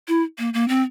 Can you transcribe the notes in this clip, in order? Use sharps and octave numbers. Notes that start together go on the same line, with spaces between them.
E4
A#3
A#3
C4